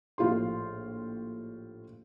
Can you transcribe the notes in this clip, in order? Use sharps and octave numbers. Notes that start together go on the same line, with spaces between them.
A#1 A2 F4 G4 C6